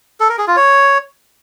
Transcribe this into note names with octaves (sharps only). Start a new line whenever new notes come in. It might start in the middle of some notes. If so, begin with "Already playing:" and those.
A4
A#4
G#4
F4
C#5